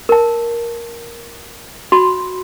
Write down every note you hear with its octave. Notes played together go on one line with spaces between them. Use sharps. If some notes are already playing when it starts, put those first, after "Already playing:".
A#4 A5
F#4 B5 C6